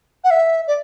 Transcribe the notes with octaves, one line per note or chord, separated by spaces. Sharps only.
F#5
E5
D5